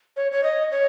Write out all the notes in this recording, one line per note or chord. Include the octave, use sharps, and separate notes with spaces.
C#5
C#5
D#5
C#5